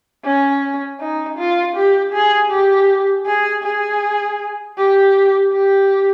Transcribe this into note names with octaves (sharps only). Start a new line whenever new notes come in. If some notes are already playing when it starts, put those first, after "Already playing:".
C#4
D#4
F4
G4
G#4
G4
G#4
G#4
G4
G4